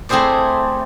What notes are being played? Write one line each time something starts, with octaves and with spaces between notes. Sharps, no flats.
A3 C4 E4 G#4 C5 D5